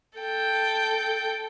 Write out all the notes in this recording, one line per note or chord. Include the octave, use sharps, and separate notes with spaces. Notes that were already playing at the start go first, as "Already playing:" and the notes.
A4 G5